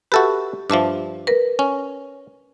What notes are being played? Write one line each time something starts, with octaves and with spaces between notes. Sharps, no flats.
F#4 G4 A4 B4 E5
G2 F3 E5 A5 D6
A#4 B4
C#4